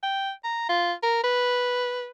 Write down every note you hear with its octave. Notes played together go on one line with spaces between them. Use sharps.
G5
A#5
F4
A#4
B4